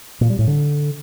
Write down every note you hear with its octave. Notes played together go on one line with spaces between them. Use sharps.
A#2
G3
A2
D3